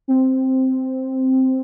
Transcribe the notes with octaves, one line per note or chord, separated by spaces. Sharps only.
C4